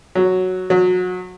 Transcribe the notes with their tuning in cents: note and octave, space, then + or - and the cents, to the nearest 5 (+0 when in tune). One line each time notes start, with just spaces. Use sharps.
F#3 +0
F#3 -25